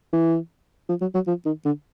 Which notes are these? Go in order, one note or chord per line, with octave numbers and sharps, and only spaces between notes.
E3
F3
F#3
F#3
F3
D#3
D3